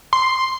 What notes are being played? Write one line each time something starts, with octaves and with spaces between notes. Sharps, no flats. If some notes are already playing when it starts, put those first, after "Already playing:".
C6